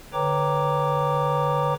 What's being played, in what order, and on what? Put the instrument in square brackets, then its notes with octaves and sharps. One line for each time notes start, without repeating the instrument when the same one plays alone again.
[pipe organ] D3 B4 C#5 G5 A#5 D6